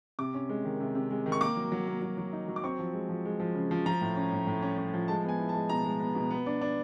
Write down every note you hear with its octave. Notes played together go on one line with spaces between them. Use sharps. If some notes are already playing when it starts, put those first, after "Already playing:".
C3 D6
C#4
G#3
D#3
C3
C3
G#3
D#3
C#6
A#3 D6
F#3
F#3
A#3
F#3
F#3
D#4
F#3
D6
C4 C#6
F3
G#3
F3
G#3
F3
C#3
F3
F3 A#5
A2
C#4
A2
A2
C#4
C#4
F3
G#3 A5
B3 G#5
E4
A5
G#3
B2 A#5
G#3
B3
B2
B3
D4
D4